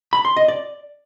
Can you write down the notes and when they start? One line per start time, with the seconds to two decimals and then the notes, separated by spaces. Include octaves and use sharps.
0.13 B5
0.25 C6
0.37 D#5
0.48 D5